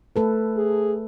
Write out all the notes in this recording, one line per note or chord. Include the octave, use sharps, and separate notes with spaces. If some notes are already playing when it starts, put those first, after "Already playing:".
A3 A4 B4
G#4